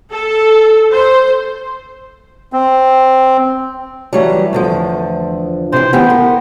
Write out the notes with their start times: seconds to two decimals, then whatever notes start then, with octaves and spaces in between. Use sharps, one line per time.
0.11 A4
0.91 C5
2.53 C4
4.13 E3 F#3 G3 A3
4.53 E2 D3 F3
5.72 C3 E3 C5
5.93 C#3 E3 B3 G4
6.10 A#4